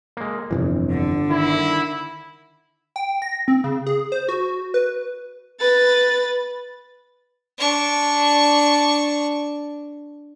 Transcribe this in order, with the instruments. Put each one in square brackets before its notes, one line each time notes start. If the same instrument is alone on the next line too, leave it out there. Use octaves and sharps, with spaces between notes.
[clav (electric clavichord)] G#3 A#3
[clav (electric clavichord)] G1 [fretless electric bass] F2 C3 E3
[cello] D3
[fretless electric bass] D#3 [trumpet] E4
[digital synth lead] G5
A#6
C4
C#3
G#4
C5
F#4
B4
[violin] B4 A6
[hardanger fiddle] D4 C#6